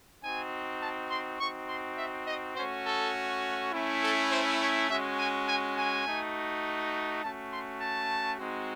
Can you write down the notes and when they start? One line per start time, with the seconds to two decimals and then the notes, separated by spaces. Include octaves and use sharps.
0.23 C4 D#4 F#4 G#5
0.81 A5
1.10 C6
1.39 C4 D#4 F#4 C#6
1.69 C6
1.98 E5
2.27 D#5
2.56 A3 C#4 F#4 C5
2.86 A4
3.72 A3 C#4 E4
4.02 A4
4.31 C5
4.60 C#5
4.89 G#3 C#4 F#4 E5
5.19 G#5
5.48 G#5
5.77 G#5
6.06 A3 D#4 F#4
7.23 A3 C#4 F#4 A5
7.52 C6
7.81 A5
8.39 G#3 C4 D#4 F#4